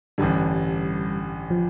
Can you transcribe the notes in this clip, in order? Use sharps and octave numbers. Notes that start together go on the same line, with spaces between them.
A1 G2 D3 G3
F3